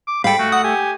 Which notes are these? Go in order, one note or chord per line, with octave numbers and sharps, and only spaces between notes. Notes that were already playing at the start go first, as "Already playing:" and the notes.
D6
G#2 G3 A4 F5 G5 B5
A3 F#4
F#5 D#6
G4 G#5